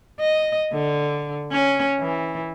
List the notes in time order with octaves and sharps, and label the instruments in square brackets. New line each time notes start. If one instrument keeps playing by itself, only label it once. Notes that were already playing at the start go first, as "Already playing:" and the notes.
[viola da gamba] D#5
D3
C#4
E3